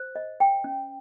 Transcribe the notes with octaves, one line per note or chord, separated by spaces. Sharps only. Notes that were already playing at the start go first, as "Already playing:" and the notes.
Already playing: C5
D#5
G5
C#4